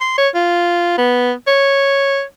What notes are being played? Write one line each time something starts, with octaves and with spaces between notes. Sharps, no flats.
C6
C#5
F4
B3
C#5